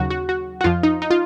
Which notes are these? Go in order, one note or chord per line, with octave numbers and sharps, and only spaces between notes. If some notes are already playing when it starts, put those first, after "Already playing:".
Already playing: D#2 C#3 F#3 F#4
F#4
F#4
F#4
F2 F3 F4
D#4
D#4
F4